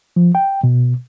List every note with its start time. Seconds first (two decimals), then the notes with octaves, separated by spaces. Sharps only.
0.16 F3
0.35 G5
0.64 B2